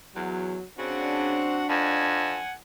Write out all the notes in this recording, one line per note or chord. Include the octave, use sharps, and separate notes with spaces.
E2 F#3
C#3 C4 D4 F#4 F#5
F2 F#5 G#5